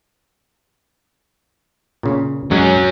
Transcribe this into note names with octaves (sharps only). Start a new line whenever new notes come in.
A#2 C#3
F#2 F#3 G#3 C#4